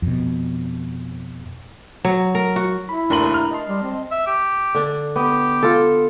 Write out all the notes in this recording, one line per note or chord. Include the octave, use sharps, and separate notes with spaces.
F2 B2
F#3
A#4
F#4
E4 B5
F1 D#2 D4 A#4 A#5 F#7
F6
D#5 A5 C6
G3
C4
E5
G4
D3 D4
B3 G4
F4 A4